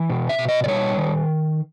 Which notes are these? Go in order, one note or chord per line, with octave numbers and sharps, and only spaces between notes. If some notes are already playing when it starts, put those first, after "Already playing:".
Already playing: E3
B2
E5
B2
D#5
D5
G3 C#5
D#3